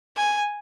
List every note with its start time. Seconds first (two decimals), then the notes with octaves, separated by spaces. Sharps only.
0.16 G#5